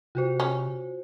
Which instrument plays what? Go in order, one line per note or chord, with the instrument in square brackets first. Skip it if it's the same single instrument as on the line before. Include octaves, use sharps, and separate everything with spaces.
[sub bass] C3 [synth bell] F4 F#4 C5
[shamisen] C#4